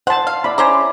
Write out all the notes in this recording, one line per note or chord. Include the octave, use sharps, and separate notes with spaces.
C5 F#5 A5
F5
E4 D5 B5
C#4 C5 D5 A#5